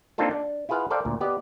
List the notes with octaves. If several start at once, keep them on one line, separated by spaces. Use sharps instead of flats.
A#3 C4 D4 D#4 F4 A4
D4
E4 F4 G#4 B4 F5 F#5
A4 A#4 C5 D5 F5 G5
D2 A#2
B3 G4 D5 D#5